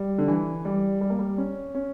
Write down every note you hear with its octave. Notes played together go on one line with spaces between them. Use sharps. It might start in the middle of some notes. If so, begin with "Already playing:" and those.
Already playing: G3
D3
E3
G3
G3
A#3
G3
C#4
C#4